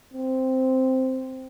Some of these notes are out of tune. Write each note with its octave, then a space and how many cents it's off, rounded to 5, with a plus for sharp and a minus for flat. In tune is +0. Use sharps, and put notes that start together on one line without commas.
C4 -5